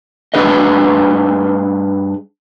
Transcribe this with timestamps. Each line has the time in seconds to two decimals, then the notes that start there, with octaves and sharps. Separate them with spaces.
0.34 G2 D4 G#4 B4 D#5